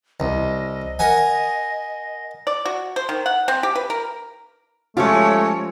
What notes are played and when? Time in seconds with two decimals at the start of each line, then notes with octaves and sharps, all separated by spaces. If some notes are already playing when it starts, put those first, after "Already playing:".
0.20 C2 D#5
0.99 A#4 F#5 G#5
2.47 D5
2.65 F#4
2.96 C5
3.09 D#3
3.26 F#5
3.48 C4
3.63 G4
3.76 B4
3.90 A#4
4.97 F3 G#3 A3 C#4 F4 G4 C#5